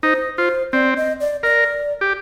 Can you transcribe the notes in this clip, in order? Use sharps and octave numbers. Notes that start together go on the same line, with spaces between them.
D#4 C5
F4 C5
C4 D5
D#5
D5
A#4 D5
G4